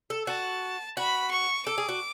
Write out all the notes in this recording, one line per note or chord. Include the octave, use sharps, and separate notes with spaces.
A4
F#4 A5
F#4 B5
C#6
A4 D6
G#4
F#4